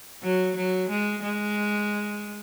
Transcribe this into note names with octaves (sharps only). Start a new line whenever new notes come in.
F#3
F#3
G#3
G#3